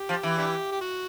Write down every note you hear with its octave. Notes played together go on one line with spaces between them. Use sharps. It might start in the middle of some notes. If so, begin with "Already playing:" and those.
Already playing: G4
F3
E3
D4 E4 G4
G4
F#4